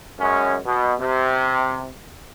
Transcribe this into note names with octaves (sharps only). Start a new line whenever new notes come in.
F#2 G#3 C#4
B2
C3